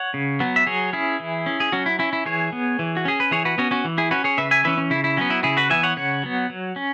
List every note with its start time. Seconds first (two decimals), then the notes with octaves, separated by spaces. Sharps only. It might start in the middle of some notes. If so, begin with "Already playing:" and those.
Already playing: C#5 F#5
0.14 C#3
0.40 F#3 B3
0.56 E5
0.66 F#3 G#4 C#5
0.93 C#4 E4 G#4
1.20 E3
1.46 C#4
1.60 G#4
1.72 F#3 C#4 F#4
1.86 E4
1.99 C#4 E4
2.13 E4
2.26 E3 G#4 C#5
2.53 B3
2.79 E3
2.97 F#4
3.05 C#4 G#4
3.20 B4
3.31 E3 G#4 C#5
3.45 F#4 B4
3.58 B3 C#4 F#4
3.71 C#4 F#4
3.85 E3
3.98 E4 G#4
4.11 C#4 F#4 B4
4.24 G#4 C#5
4.38 C#3 B4 E5
4.51 E5 G#5
4.64 E3 C#4 B4 E5
4.78 C#4
4.90 C#3 E4
5.04 E4
5.17 F#3 B3 C#4
5.30 E4
5.43 C#3 E4 G#4
5.57 F#4 B4
5.70 E3 B3 E5 G#5
5.83 C#5 F#5
5.97 C#3 C#5 F#5
6.23 F#3 B3
6.50 F#3
6.76 C#4